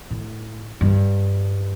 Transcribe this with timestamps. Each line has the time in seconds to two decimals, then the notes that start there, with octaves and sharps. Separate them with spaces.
0.10 A2
0.81 G2